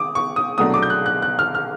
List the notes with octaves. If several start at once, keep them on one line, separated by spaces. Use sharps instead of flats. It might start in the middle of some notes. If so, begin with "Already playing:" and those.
Already playing: D6 D#6
C#6
D#6
C2 B2 F#3 A3 D4 D#6
D6
G6
F#6
F#6
F#6
F6
F6